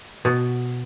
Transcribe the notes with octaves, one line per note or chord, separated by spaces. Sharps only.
B2